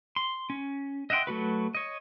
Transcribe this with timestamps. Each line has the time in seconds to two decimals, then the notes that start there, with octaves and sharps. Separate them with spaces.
0.16 C6
0.50 C#4
1.10 D#5 E5 F#5 G5 C6
1.27 F#3 A3 F#4 B4
1.75 C#5 D#5